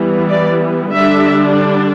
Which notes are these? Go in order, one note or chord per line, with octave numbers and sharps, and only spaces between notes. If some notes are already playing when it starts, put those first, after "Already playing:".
Already playing: E3 G3 B3
D5
D3 G3 D4 E5